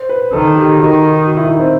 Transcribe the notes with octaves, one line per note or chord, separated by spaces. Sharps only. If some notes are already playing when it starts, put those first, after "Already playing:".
Already playing: C5
B4
D#3 A4
G4
D#3 F#4
F#4
E4
D#4
C4